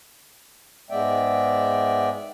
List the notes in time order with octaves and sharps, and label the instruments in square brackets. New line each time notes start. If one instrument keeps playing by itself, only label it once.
[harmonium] G#2 G#3 B3 D5 E5 G5